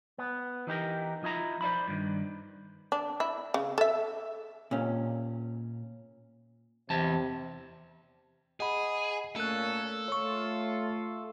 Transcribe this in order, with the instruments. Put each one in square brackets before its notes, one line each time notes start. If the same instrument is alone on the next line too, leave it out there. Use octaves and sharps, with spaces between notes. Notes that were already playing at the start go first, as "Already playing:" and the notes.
[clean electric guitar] B3
E3 D#4 G4 A#4
F3 D#4 E4 A#5
C5 D5 E5 B5
G2 D#3
[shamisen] D4
E4
C#3
A4 E5
[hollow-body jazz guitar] A#2 C#4
[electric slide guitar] E2 A5 [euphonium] C3
[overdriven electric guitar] G#4 [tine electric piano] D#5 F#5 B5
[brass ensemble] A#2 A#3 C#4 [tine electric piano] A3 F#6 [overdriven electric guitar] A4
[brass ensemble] A3 F4 [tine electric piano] C#5 C#6